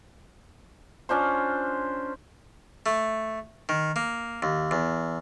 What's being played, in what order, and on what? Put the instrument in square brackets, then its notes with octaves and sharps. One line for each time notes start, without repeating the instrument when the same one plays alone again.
[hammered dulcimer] C#4 D4 F4 C5
[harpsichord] A3
D#3
A#3
D#2
E2